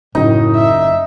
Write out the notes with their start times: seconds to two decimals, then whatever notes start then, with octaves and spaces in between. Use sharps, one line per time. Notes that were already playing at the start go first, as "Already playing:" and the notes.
0.15 F#1 F#2 A2 D#4
0.56 E5